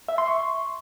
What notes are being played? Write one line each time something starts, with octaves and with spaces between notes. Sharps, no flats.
E5
C6
C#6